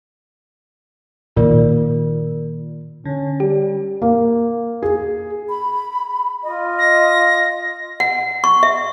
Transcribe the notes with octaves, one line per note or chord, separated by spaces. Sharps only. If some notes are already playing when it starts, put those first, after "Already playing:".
A#2 D#3 A#3 F4 A#4 D5
D3 C#4
G3 G4
A#3
G#4
B5
F4 D#5
A#6
F#5
C#6
E5